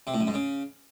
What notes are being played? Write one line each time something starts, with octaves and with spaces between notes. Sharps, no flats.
C3
A2
F#2
G#2
C#3